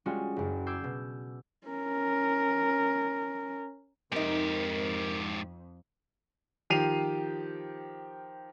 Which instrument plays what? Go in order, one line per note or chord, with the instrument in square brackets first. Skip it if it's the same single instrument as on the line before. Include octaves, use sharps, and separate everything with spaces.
[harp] G3 G#3 C#4 F4 F#4
F#1 F#2
D6 E6 G6 G#6 C7
B2
[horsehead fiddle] C#4 A#4
[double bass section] F2 [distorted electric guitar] G#2 G4 [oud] C4 D#4 [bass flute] A#4
[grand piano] D#3 F3 G4 C7 D#7 F7